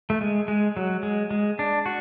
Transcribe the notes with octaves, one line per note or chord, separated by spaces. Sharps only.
A3
G#3
G#3
F#3
G#3
G#3
D4
F#4